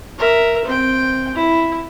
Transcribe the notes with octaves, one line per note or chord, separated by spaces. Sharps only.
A#4 E5
C4 G5
E4